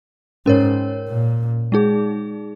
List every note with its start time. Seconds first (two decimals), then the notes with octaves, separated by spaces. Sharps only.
0.46 G#2 C#4 A#4 C#5
1.09 A#2
1.72 G#3 D#4 G#4